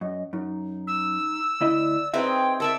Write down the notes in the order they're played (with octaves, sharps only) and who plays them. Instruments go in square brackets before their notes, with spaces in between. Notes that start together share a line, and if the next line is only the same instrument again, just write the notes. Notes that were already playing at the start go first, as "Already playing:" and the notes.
[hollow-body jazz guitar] F#2 [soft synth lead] D#5
[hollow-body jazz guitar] F#2 [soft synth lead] D#4
[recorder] E6
[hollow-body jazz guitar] D2 E4 D#5 [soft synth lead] D5
[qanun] C4 D#4 G#4 [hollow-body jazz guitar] B4 E5 [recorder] G5
[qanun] A4 D5 E5 [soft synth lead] A#4 [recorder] E6